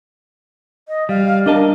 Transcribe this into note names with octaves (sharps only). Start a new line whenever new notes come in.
D#5
G3 F5
D4 A#4 D#5 A5